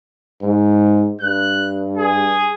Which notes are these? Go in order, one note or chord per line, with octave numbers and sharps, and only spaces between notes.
G#2
G2 F#6
G#4